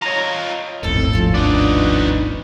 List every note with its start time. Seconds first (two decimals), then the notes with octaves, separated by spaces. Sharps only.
0.02 F4 C#5 D#5 A#5
0.83 D#1 G#1 F2 A2 C4 A4
1.13 F3 C#4
1.34 B3 D4 D#4